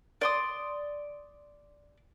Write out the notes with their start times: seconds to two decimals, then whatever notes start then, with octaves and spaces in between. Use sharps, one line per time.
0.21 D5 C6 D#6